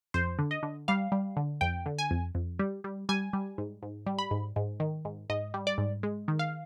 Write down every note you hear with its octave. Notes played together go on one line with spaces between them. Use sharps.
F2 C5
D3
D#5
D3
G3 F5
G3
D3
F2 G5
D3
G#5
F2
F2
G3
G3
G3 G#5
G3
G#2
G#2
G3
B5
G#2
G#2
D#3
G#2
G#2 D#5
G3
D5
G#2
G#3
D#3
F5